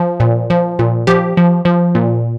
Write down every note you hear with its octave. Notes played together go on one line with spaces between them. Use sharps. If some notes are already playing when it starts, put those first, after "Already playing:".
Already playing: F3
A#2
F3
A#2
F3 G4
F3
F3
A#2